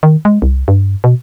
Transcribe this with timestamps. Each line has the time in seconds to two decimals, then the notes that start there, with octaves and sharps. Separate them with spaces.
0.03 D#3
0.25 G#3
0.42 C2
0.68 G2
1.04 B2